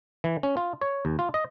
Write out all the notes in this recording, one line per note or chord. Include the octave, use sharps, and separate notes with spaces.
E3
C#4
F4
C#5
D#2
F4
D#5